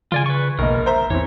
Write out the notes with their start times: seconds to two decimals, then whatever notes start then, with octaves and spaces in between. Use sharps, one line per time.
0.12 C#3 F4 D5 G#5
0.26 B4 C#6
0.59 E1 A#1 A#3 A#4 D#5
0.86 C5 E5 A#5
1.10 E2 E3 C4 C#5